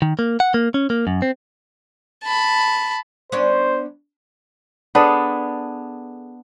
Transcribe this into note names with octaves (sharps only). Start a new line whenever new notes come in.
D#3
A#3
F#5
A#3
C#4
A#3
F#2
C4
A5 B5
B3 C#4 D4 C5
B3 D4 G#4 A4